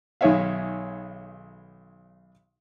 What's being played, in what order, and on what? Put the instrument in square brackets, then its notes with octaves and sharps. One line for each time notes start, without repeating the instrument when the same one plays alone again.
[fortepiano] B1 D#3 G#4 C#5 E5 F5